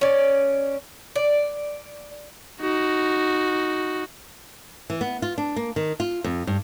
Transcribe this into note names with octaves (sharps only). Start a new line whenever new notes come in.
C#4 D5
D5
D#4 F#4
E3
B3
F4
D4
A#3
D#3
F4
F2
G2